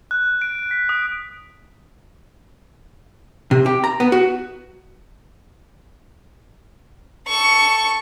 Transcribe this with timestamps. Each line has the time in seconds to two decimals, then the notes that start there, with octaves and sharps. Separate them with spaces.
0.11 F#6
0.42 D7
0.71 B6
0.89 D#6
3.51 C3
3.66 G4
3.84 A#5
4.00 B3
4.12 F#4
7.28 A4 C#6